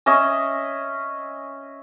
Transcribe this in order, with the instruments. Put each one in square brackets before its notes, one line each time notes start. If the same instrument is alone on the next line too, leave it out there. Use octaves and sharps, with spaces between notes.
[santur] C#4 D#5 E5 D#6